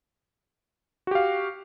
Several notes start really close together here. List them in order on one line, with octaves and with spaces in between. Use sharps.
F#4 G4 F5